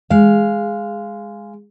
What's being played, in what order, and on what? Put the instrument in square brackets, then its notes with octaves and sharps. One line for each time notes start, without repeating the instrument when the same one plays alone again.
[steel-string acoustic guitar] G#3 F5